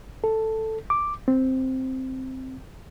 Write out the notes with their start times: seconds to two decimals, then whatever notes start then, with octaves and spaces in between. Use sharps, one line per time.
0.24 A4
0.90 D6
1.28 C4